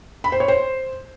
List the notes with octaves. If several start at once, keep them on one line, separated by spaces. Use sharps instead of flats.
B5
C5
C#5
C5